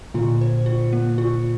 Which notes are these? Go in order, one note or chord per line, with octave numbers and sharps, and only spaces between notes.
A#2 D3 F4
C5
F4
A#3
F4